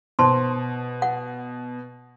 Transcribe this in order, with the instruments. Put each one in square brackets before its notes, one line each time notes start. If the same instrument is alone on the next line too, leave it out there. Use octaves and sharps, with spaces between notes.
[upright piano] B2 [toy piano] C5 A5 C6
[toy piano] F#5